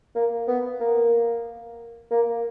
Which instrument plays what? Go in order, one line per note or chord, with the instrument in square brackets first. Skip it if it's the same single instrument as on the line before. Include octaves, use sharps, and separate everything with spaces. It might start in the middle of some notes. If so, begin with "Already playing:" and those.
[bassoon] A#3
B3
A#3
A#3